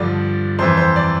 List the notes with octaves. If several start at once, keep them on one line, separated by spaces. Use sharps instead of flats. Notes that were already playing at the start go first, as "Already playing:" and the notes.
Already playing: G2 D3 F3 D5
F2 E3 C5
C5
D5